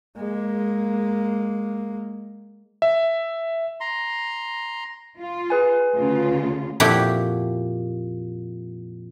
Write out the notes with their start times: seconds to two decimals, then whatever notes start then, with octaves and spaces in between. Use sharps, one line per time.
0.17 G#3 A#3
2.82 E5
3.80 A#5 C6
5.18 F4
5.50 G#4 B4 G#5
5.95 D2 C#3 F4
6.80 F2 A#2 E4 F#4 G4